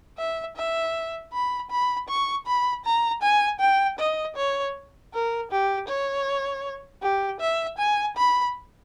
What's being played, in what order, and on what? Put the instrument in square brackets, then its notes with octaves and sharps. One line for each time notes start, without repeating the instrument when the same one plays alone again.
[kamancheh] E5
E5
B5
B5
C#6
B5
A#5
G#5
G5
D#5
C#5
A#4
G4
C#5
G4
E5
G#5
B5